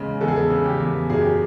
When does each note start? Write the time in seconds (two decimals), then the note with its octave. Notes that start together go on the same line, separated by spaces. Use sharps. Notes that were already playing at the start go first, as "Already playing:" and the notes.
Already playing: E2 C#3 G#3
0.21 E2 A4
0.28 G#4
0.36 A4
0.50 C#3
0.65 G4
0.80 E2
1.10 F#2 G#4
1.22 G4